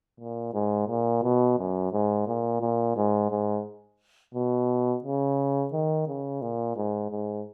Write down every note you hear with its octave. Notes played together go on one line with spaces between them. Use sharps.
A#2
G#2
A#2
B2
F#2
G#2
A#2
A#2
G#2
G#2
B2
C#3
D#3
C#3
A#2
G#2
G#2